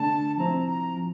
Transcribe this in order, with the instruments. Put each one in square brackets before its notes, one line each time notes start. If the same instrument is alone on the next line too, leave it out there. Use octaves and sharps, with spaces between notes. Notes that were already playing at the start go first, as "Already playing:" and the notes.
Already playing: [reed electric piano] D3 A3 D4 [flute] A5
[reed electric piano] F3 C4 E4 [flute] A#5
[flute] A#5
[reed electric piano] F3